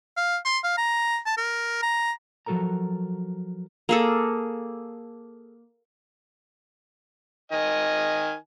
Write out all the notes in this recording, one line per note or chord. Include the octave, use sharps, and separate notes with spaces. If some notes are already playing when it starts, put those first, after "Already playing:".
F5
C6
F5
A#5
A5
A#4
A#5
F3 F#3 F#4 A4 A#4 A#5
A#3 G#4 A4
D#3 D#5 G#5